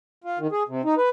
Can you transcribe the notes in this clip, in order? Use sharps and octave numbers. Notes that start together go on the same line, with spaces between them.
F4
D#3
G#4
C3
D#4
B4